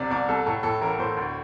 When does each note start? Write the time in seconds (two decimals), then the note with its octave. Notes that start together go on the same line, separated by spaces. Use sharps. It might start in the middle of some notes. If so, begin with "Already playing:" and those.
Already playing: C2 C3 D5
0.10 C2 D5
0.28 C2 A4
0.46 A2 A4
0.63 A2 A4
0.81 A1 A#4
0.99 A2 C5
1.17 D2